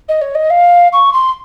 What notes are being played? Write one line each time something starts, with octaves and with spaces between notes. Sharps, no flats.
D#5
C#5
D#5
F5
C#6
C6